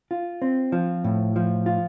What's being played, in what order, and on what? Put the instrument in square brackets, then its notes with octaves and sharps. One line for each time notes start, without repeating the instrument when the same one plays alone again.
[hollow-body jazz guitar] F4
C4
F3
A2
F3
F4